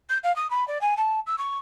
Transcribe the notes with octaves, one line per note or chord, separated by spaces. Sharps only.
G6
F5
D#6
B5
D5
G#5
A5
E6
C#6